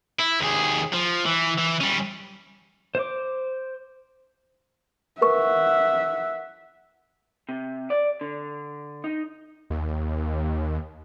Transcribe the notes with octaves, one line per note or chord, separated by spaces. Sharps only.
E4
D#2 G#4
F3
E3
E3
G3 C#4
C5 D6
A#4 B4 E5 F#5 C#6
C3
D5
D3
D#4
D#2